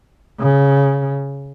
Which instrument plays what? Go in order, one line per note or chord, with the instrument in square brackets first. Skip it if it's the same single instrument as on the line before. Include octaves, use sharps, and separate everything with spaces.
[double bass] C#3